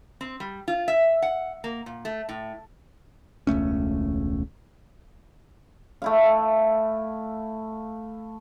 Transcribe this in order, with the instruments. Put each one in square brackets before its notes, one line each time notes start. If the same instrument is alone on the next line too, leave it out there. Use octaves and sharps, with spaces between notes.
[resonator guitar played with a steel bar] C4
G3
F4
E5
F#5
A#3
A#2
A3
A2
[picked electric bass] E1 C#2 A3 C#4
[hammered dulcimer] A3 E4 F5